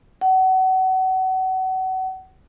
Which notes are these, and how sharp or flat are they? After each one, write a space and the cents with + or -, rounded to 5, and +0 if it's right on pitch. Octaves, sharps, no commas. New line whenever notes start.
F#5 +30